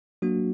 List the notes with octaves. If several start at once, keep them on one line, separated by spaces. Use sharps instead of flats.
F#3 A#3 D4 F#4